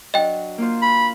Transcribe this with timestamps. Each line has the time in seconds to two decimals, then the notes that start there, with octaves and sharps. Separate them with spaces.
0.14 F#3 D4 D#5 G5
0.58 A#3 F4 C5
0.82 B5